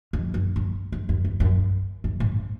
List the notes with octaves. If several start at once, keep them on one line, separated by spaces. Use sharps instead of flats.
F2
F#2
F#2
F#2
F#2
F2
F#2
F#2
G#2